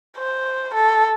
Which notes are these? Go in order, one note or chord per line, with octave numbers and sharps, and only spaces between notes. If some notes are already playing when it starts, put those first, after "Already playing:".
C5
A4